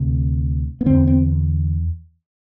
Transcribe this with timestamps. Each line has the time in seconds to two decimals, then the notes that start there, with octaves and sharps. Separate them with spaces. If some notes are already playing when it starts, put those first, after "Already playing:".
Already playing: D2 C3
0.81 B3
0.86 E2 D3 C4
1.07 C4